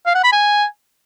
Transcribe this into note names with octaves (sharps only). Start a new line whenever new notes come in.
F5
F#5
B5
G#5